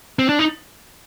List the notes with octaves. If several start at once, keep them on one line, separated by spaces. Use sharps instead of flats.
C4
D4
D#4